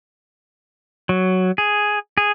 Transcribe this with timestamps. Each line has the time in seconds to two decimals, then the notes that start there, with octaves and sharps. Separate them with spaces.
1.09 F#3
1.58 G#4
2.18 G#4